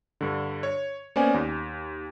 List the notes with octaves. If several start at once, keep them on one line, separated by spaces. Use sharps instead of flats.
G2 D3
C#5
A#3 B3 C#4 C5 D5 G#5
D#2